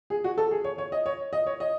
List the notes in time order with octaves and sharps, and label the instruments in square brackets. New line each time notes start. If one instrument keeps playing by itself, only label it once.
[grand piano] G#4
F#4
A4
G#4
C#5
C#5
D#5
C#5
D#5
C#5
D#5